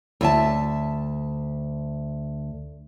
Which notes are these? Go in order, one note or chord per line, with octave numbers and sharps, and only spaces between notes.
D2 E5 A5